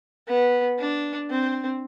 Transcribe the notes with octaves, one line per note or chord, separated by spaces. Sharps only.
B3
D4
C4